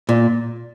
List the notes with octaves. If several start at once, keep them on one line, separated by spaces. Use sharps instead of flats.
A#2